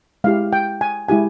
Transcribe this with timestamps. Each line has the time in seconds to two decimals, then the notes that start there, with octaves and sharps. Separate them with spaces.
0.24 G#3 E4 G4 F5
0.53 G5
0.81 G#5
1.09 G#3 E4 G4 G#5